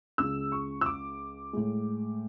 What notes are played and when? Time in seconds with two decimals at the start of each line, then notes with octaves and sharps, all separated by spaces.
0.18 C#2 C#3 G#3 E6
0.52 C#6
0.81 E6
0.86 D6
1.53 A2 G#3